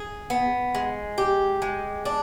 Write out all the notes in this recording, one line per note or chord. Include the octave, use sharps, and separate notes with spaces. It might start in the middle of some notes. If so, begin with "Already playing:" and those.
Already playing: G#4
B3
G#3
G4
G#3
D4